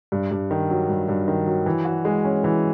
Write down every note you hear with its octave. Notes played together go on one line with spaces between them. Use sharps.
G2
G2
D#3
F#3
G2
G2
D#3
F#3
E3
F#4
G#3
C#4
E3